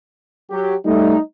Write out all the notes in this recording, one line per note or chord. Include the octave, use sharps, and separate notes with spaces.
F#3 G4
G3 A3 D#4